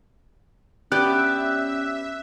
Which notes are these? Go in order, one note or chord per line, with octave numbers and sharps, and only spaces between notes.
B3 C#4 G4 D5 E5 F#6